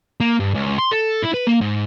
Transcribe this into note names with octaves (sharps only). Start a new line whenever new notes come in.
A#3
G2
C#2
C6
A4
E4
B4
A#3
G#2